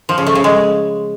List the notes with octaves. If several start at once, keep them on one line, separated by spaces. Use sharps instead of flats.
F3
C#3
A3
C#3
G#3